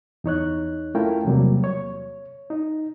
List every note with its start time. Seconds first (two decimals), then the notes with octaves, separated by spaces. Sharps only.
0.24 E2 D#4 C#5 F#6
0.95 A3 C#4 E4 F4 A#4 G5
1.25 E2 C3 F#3 G3 A#3
1.64 C#5
2.50 D#4